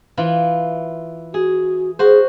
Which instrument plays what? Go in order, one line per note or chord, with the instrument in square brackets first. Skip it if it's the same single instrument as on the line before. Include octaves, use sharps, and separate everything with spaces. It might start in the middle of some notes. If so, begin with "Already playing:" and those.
[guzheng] E3 E4 F4
[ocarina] F#4 [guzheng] G#4
[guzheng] F#4 C5 [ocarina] G#4